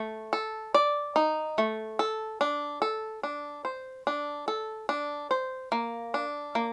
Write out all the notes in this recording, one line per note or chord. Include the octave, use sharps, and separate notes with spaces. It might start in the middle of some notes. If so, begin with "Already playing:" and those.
Already playing: A3
A4
D5
D#4
A3
A4
D4
A4
D4
C5
D4
A4
D4
C5
A#3
D4
A#3